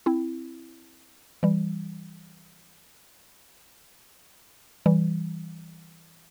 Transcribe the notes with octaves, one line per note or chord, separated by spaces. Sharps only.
C4 E4
E3 G3
E3 G3